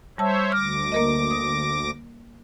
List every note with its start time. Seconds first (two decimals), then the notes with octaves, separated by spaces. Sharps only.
0.18 G3 C5 C#5 E5 A5 E6
0.52 D2 D6 F6 A#6
0.92 A#3 A#4 D#5
1.31 D#6